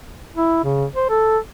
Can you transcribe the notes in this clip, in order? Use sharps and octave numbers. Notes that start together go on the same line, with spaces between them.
E4
C#3
C5
A4